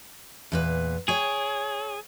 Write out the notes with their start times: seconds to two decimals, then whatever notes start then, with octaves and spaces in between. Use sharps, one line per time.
0.52 E2 A#2 B4
1.08 G#4 C#5 G5